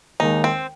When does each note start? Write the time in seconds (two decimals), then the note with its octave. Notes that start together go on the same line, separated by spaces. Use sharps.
0.20 D#2 D#3 G#3 D#4
0.44 C4